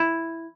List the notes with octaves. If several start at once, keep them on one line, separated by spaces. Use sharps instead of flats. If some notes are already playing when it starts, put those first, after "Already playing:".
Already playing: E4